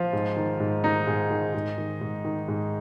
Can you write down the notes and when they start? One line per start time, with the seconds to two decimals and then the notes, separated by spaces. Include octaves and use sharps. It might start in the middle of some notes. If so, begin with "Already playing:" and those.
Already playing: F3 F4
0.13 G#2
0.37 D#3
0.60 G#2
0.84 D#3 D#4
1.07 G#2
1.30 D#3
1.54 G#2
1.78 D#3
2.01 G#2
2.25 D#3
2.48 G#2